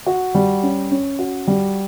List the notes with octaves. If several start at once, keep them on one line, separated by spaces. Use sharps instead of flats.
F#4
G3
C#4
C#4
F#4
G3